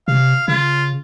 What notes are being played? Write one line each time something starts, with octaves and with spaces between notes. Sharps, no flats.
C3 F5
C#3 F4